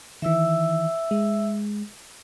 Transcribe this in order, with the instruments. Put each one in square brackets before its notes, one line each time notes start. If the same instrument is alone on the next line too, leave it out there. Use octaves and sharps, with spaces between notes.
[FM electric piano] D#3 E3 [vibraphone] E5 E6
[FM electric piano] G#3